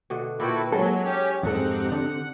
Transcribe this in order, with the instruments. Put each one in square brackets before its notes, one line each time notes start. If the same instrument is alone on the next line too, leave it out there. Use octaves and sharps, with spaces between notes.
[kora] B2 D3 A3
[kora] A#2 G5 [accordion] E4 F#4 A4 [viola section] B4
[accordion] G#2 [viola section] F#3 A#3 [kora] G#3 E4 F#4 [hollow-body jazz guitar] A4
[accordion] C#4 G4 [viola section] C#5
[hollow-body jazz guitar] F2 G#2 A4 [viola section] C4 D#4 G4 [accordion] F#5
[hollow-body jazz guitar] D3